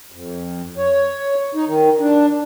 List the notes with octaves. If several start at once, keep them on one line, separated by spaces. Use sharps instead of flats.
F2
C#5
D#4
D#3
D4